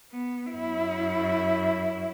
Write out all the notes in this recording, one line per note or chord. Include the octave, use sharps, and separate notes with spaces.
B3
F#2 E4